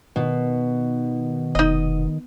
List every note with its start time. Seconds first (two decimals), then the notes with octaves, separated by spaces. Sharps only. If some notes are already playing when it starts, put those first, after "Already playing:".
0.16 B2 D#3
1.55 F1 D#4 D#5